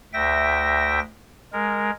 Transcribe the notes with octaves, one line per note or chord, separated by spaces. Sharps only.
D2 E5 G5 A#6
G#3 A#4